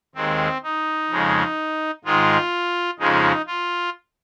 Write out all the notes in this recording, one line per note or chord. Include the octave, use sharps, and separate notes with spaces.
D#2 D#3 G#3 C4
D#4
F2 C#3 G#3
G#2 D#3 G#3 F4
F2 C#3 F3 G#3 D#4
F4